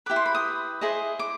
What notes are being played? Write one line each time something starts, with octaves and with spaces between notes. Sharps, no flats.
E4 G4 B4 D6
C6
B5
D#6
E4 G#4 C5 D#5
D6